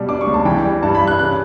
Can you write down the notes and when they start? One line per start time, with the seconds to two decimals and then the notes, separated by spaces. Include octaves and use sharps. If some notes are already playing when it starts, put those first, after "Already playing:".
Already playing: B2 G3
0.09 D4 D6
0.21 C#6
0.27 C#2
0.34 A5
0.45 E3 G5
0.64 G3
0.82 G2 A5
0.95 B5
1.01 G2
1.07 F#6
1.19 C#3 F#6